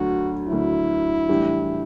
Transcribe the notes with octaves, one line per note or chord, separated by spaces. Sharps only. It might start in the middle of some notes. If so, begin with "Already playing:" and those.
Already playing: D2 D3 F#3 F#4
D2 D3 F#3 E4
A2 E3 G3 D4 G4